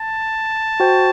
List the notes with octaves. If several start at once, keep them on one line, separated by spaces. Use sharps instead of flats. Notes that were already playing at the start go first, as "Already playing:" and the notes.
Already playing: A5
F#4 C5 G5